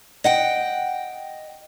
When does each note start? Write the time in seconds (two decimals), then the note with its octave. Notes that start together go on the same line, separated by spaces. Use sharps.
0.24 D#5 F#5 G5